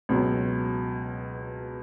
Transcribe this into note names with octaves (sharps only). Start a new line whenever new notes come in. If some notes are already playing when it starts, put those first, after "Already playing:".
C#2 B2 F#3